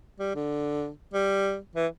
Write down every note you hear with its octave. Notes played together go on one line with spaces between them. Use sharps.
G3
D3
G3
E3